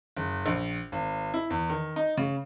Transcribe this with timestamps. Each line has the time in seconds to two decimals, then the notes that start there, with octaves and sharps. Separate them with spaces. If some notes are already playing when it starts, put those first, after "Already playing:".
0.16 F#1
0.46 A#1
0.92 G#1
1.34 E4
1.50 E2
1.70 D#3
1.96 D#4
2.17 C#3